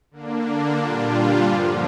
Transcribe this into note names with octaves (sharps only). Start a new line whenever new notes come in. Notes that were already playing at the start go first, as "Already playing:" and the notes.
D3 A#3 D4
A#2 G3 D4 F4
G2 D3 F3